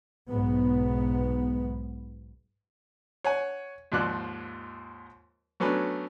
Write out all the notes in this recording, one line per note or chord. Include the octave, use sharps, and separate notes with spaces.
B1 G#2 B3
C#5 F#5 G#5
D#2 G#2 F3 D5 F#6
F#3 A3 B3 C#4 D4